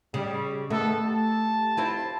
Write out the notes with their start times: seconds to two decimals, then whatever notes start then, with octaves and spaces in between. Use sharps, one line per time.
0.14 C#3 G3
0.70 D#3 A3 B3 A4
1.06 G4 A5
1.77 C4 E4 F4